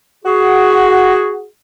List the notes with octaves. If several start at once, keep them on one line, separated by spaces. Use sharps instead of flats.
F#4 G#4